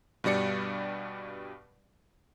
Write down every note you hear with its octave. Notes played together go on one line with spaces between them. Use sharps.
G2 B2 G3 D5 C#7